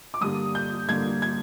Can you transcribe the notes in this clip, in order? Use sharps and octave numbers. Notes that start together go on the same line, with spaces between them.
D6
G2 D3 G3 A#3 D#6
G6
G2 D3 G3 A#3 G#6
G#6